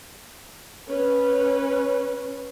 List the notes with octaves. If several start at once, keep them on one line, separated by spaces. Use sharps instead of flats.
C#4 B4